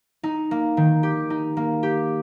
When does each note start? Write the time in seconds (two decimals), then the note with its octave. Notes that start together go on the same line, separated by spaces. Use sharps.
0.23 D#4
0.51 A#3
0.77 D#3
1.03 G4
1.30 D#4
1.57 A#3
1.83 G4